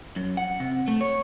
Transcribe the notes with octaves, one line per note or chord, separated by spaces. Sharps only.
F#2
F#5
C3
A3
C#5